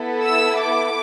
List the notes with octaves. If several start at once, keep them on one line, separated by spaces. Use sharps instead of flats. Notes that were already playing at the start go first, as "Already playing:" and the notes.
Already playing: B3 E4 A4
E6
D6